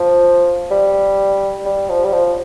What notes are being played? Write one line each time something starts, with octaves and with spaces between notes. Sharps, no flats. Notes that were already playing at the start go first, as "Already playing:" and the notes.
Already playing: F3
G3
G3
F3
G3
F3